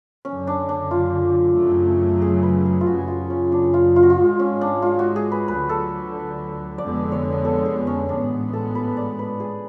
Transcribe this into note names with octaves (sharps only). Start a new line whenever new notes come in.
F#1 F#2 D3 C#4
D4
D4
F4
F#2 C#3 F#3 A3
G#4
B4
G#4
F4
F#1 F#2 C#3 F#4
F4
C#4
D4
F4
F4
F#4
F4
G#1 G#2 G#3
C#4
D4
F4
F#4
G#4
B4
D2 D3 F#3 B4
A4
F1 F2 D3 G#3 B3 D5
C#5
A4
G#4
C#4
A1 G#2 G#3 B3 D4
A4
B4
D5
B4
G#4